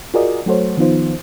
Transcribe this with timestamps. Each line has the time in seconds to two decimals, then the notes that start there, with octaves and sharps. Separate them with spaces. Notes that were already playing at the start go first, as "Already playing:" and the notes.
0.14 F4 F#4 G#4 A#4 D5 D#5
0.46 F#3 A3 F#4 A4 C5 C#5
0.77 D#3 F3 B3 D#4 F4 C5